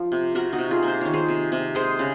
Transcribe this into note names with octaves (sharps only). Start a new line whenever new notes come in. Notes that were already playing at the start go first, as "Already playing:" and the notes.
Already playing: F3
C3
C3 F#4 A#4
D#4 F#4
C3
F4 G#4
A#3
C5
D#3 C#5
G#4 C5
C3
C3
G#3 G#4 C5
C#3